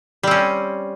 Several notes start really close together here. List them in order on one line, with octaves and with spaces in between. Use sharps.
G3 C4 C#4